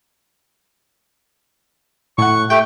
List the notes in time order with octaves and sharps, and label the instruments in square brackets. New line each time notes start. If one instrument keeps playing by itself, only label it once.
[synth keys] A2 F#5 [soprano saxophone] C#6
[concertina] A3 [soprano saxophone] G4 [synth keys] G5